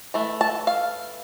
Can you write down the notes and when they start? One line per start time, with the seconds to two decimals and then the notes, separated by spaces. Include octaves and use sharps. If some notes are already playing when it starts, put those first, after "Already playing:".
0.14 E3 A3
0.41 A5
0.67 F5